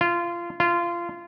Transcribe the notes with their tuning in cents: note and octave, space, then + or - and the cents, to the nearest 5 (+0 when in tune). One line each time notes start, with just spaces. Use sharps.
F4 -20
F4 -20